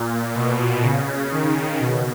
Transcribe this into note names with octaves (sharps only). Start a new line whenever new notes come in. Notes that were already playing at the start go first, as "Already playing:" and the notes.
Already playing: A#2
B2
C#3
D#3
B2